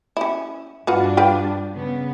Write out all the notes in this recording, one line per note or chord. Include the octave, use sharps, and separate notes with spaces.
C#4 E4
G2 D4 F4 F#4 B4
F4 B4 G5
C#3 B3